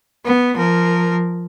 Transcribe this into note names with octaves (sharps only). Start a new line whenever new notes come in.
B3
F3 A#4